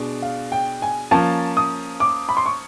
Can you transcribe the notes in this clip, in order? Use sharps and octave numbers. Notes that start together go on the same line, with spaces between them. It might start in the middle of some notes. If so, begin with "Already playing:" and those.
Already playing: B2 G#3 D4
F5
G5
G#5
F3 A#3 C#4 A5
D#6
D6
B5
C6
C#6